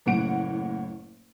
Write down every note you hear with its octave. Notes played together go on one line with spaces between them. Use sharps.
F#1 A2 A#3 F#5 D7